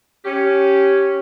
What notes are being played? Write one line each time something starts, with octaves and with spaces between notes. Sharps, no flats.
C#4 G4